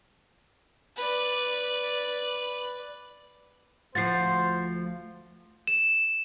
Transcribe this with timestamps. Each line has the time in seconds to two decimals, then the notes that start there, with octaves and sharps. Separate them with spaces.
0.97 B4 D5
3.95 D2 F3 F#4 C5 A6 C7
5.67 E7